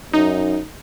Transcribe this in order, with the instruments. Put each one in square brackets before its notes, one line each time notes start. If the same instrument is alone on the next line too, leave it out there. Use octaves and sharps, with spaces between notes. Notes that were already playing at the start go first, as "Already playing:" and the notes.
[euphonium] F#2 [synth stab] D#4